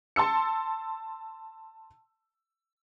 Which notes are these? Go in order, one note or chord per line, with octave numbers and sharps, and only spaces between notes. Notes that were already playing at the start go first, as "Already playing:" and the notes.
A5 C6 E6 C#7